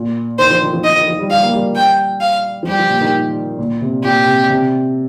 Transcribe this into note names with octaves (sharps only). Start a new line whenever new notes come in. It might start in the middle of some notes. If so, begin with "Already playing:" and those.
Already playing: A#2
D#3 C5
F3
D#3
F3
F3 D#5
D#3
F3
G3
G3 F5
A#3
G3
G5
F5
F3
G3 G4
F3
A#2
D#3
A#2
C3
A#2 G4
C3
C3